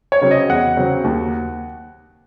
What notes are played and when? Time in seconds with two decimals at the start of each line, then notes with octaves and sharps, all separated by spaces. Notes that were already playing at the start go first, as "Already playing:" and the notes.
0.12 C#5
0.21 C#3 F#3 C4
0.31 D#5
0.49 E2 F#5
0.76 C#3 F#3 C4
1.04 D#2